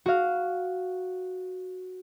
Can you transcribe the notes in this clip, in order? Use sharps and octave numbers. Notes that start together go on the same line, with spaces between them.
F#4 F5